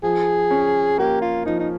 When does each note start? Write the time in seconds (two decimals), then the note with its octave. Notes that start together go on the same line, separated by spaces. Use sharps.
0.03 F3 G#4
0.51 C#4
0.98 A#3 G4
1.22 F4
1.46 F3 D#4
1.59 D#4